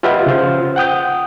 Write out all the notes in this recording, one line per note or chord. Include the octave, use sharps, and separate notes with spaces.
F4 G4 B4 D#5 E5 F#5
C#3 F4 C5
F#5 G5 D#6 G6